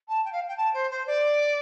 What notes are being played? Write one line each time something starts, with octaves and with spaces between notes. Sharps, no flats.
A5
G5
F5
G5
A5
C5
C5
D5